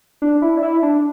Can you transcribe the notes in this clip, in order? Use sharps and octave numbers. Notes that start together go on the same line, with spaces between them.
D4
E4
D4
E4
D4